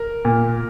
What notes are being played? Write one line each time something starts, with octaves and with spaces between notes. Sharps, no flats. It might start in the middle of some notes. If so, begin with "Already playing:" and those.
Already playing: A#4
A#2